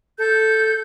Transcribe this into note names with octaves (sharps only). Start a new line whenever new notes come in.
A4 G6